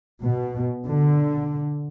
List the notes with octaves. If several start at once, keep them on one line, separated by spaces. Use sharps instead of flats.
B2
D3